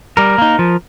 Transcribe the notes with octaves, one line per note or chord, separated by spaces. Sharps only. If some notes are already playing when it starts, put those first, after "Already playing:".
G3 A#4
A#3 D#4
F3